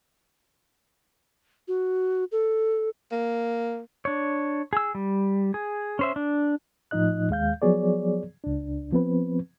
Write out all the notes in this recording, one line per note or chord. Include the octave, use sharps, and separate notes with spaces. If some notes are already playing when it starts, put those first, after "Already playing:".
F#4
A4
A#3
D4 C#5
G#4 E6
G3
G#4
C#4 C5 E5
D4
A2 F3 D#4 D#5 F#6
D#2 G#3 F5 G6
F3 F#3 B3 G#4 C#5 D5
C#2 D4
F3 B3 C4 B4